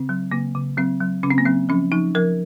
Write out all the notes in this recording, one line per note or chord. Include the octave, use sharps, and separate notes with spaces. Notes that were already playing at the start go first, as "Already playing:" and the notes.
Already playing: C#3 C4
F#3
C#3 A#3
C#3
F#3 C4
F#3
C#3 C#4
C4
A#3
F#3 C4
F3 C#4
F3 D#4
F3 A#4